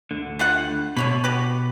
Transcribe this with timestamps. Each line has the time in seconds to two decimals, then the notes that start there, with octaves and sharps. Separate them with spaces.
0.11 D2 D3
0.39 G3 F4 F#5
0.97 B2 D3 C#5 B5
1.24 F#4 G4 B4